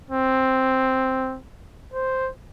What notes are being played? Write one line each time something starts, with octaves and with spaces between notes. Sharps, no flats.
C4
C5